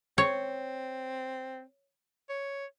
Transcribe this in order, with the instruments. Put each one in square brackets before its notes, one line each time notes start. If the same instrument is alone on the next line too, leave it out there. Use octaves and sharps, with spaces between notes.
[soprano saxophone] C4 [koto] C#5
[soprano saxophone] C#5